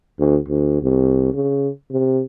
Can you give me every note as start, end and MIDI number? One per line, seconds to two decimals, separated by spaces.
0.19 0.37 38
0.49 0.79 38
0.82 1.30 36
1.34 1.68 49
1.91 2.22 48